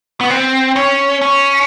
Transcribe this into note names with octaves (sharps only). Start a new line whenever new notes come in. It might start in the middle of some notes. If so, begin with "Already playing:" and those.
B3
C4
C#4
C#4